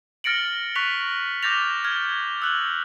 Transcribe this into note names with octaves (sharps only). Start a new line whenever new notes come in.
F6 A6 A#6 C#7 D7 F#7
C#6 F#6 B6 F7
D6 F6 G6 A6 A#6 F7
F6 G#6
E6 F#6 F#7